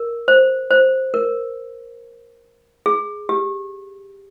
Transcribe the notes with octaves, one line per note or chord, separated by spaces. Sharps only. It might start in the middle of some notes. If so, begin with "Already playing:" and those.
Already playing: A#4
C5
C5
A#4
G#4
G4